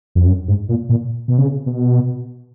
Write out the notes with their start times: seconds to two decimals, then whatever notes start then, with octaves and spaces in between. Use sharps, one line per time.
0.15 F2
0.27 F#2
0.48 G#2
0.69 A#2
0.89 A#2
1.28 B2
1.38 C#3
1.66 B2